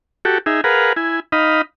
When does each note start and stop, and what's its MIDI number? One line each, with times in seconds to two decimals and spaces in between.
0.25 0.38 66
0.25 0.38 67
0.25 0.38 69
0.46 0.61 63
0.46 0.61 68
0.46 0.61 76
0.64 0.93 68
0.64 0.93 70
0.64 0.93 71
0.64 0.93 77
0.64 0.93 78
0.96 1.20 64
0.96 1.20 80
1.32 1.62 63
1.32 1.62 75
1.32 1.62 77
1.32 1.62 83